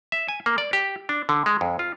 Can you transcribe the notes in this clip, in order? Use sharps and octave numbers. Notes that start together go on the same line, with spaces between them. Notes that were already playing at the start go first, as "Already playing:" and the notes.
E5
G#5
A#3
D5
G4
D4
D3
G#3
F2
F4